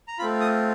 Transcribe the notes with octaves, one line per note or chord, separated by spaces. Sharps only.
A#5
A3 C4 F4 B5
D#6